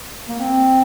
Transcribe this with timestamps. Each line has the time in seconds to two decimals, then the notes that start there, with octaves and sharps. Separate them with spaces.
0.29 A#3
0.39 C4